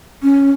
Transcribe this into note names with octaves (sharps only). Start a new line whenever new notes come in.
C#4